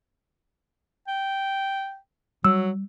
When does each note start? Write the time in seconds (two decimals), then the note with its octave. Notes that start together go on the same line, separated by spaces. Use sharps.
1.07 G5
2.44 F#3 G3 E6